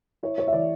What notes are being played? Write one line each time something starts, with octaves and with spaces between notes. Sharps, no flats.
E4 C#5
C#5
E5
E3 D5